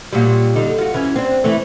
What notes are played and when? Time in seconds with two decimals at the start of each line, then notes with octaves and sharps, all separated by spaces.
0.13 A#2 F#3 G3
0.56 D3 G3 D#4
0.78 F4 F#4
0.94 E3 C#4
1.16 C4 D4
1.44 E3 A3